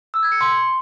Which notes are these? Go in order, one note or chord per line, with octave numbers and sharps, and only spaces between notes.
E6
G#6
C#7
C6